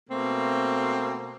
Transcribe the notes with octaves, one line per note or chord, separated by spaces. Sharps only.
B2 A3 A#3 C4